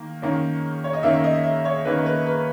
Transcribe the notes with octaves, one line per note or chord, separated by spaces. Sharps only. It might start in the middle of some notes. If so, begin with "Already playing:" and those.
Already playing: D#3 A#3
D#3 A#3 C#4
C#5
D#5
D#3 A#3 C#4 E5
D#5
E5
C#5
D#3 A#3 C#4 B4
B4
B4